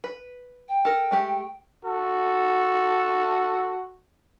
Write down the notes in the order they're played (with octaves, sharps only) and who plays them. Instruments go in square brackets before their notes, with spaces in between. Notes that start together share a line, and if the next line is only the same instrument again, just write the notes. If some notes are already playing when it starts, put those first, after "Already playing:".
[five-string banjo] B4
[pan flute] G5
[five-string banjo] A4 A#4
G#3 A3 G4
[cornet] F#4 [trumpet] A4